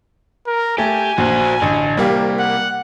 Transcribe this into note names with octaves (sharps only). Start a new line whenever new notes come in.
A#4
A3 G4 G#5
A#1 F#4 C5
A1 D3
C2 G3 A#3 G4
F#5